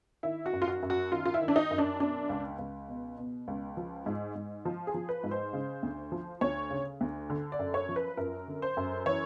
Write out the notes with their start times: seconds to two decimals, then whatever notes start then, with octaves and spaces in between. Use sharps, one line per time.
0.23 D#3 E4
0.46 F#4
0.53 F#2
0.62 F4
0.68 F#4
0.83 F#2
0.90 F#4
1.11 D#3 F4
1.25 F4
1.34 E4
1.41 D#3
1.48 D4
1.56 D#4
1.71 F#2
1.78 D4
2.00 B2 D4
2.29 C#2
2.59 C#2
2.88 B2
3.18 B2
3.48 C#2
3.77 F3
4.06 G#2
4.35 G#2
4.65 F3
4.87 G#4
4.94 F3
5.09 B4
5.24 G#2
5.31 C5
5.53 C#3
5.83 D2
6.12 F3
6.41 D2 C#5
6.71 C#3
7.01 D2
7.30 D3
7.52 D5
7.59 F#2
7.74 C#5
7.89 F3
7.96 B4
8.17 F#2 A#4
8.47 D3
8.62 C5
8.77 F#2
9.06 E3 C#5